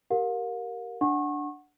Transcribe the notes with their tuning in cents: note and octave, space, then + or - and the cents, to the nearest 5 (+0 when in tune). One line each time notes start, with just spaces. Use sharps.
G4 -10 A#4 +0 F5 +45
D4 +0 F#5 +0 C#6 -30